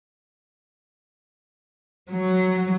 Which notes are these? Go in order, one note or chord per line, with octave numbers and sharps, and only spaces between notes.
F#3